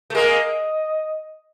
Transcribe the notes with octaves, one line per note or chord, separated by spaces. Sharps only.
A3
G#3 A#3 D#5